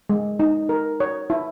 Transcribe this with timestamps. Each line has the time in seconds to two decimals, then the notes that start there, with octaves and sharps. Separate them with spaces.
0.10 G#3
0.40 D#4
0.69 A#4
1.00 C#5
1.30 E4